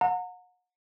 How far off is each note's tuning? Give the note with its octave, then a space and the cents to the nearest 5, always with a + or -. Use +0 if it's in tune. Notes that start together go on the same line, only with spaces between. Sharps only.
F#5 -35 A#5 -30